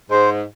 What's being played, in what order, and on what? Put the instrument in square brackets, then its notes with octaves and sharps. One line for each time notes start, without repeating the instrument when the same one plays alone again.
[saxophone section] G#2 [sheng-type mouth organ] C5